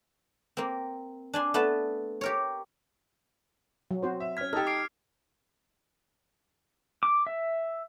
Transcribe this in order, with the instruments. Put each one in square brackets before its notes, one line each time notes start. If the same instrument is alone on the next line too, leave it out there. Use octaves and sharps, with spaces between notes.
[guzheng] A#3 C4
D4 G#5 C6
A3 B3 B4 A5
G4 A#4 C#5
[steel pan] F#3
C4 F#4 C5
[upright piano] E5
[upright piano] C#4 B6 [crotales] F6 G#6
[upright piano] D#4 G4 [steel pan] A4 [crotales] F6
[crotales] D6 C7 D7
[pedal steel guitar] D6
E5